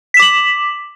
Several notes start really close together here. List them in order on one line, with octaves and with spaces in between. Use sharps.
B6 E7 D6 F#7